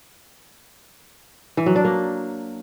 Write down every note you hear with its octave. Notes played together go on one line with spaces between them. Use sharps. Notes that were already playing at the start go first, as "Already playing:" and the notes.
E3
F#3
D4
A#3